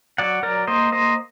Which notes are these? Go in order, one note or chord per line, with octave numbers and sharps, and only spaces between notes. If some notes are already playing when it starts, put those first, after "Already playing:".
F#3 D5 F#5
F#3 A#4 D5
A#3 C5 D#5
A#3 C5 D#5